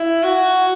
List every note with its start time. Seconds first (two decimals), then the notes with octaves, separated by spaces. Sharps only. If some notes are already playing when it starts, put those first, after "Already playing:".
Already playing: E4
0.23 F#4